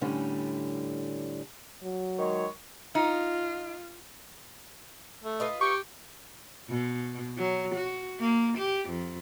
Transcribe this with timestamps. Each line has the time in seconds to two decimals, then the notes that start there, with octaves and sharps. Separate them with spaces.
0.01 A2 D3 G3 C#4
1.83 F#3
2.19 D#3 G#3 C#5
2.95 D#4 F4
5.23 A3
5.40 F4 B4 D#5
5.61 G4 C#6
6.69 B2
7.38 F#3
7.75 F#4
8.19 A#3
8.58 G4
8.89 F2